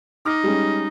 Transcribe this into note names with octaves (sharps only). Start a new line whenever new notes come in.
D#4 D6 F6 A#6
G3 G#3 C#4